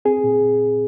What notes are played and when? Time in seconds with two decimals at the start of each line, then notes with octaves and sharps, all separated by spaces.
0.05 C4 G#4
0.24 A#2